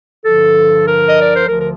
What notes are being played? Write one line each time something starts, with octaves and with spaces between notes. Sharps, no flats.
G2 D3 F3 A4
A#4
D#5
D5
C5
D2 D3 F3 A#4
A#4